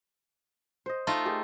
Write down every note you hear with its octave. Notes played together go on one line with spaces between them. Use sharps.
C5 D#5
A3 D#4 F4
G4 G#4 A#4